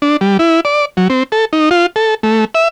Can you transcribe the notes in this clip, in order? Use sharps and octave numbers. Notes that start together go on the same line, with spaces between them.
D4
G3
E4
D5
F#3
C4
A4
D#4
F4
A4
A3
E5